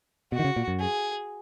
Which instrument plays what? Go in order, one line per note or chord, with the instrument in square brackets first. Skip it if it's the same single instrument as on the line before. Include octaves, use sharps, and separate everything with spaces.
[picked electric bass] B2 [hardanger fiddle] F#4
[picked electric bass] D#3
C#3
A#2
F#2
[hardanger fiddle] G#4